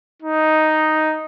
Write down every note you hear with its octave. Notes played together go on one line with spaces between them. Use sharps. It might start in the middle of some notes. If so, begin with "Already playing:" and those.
D#4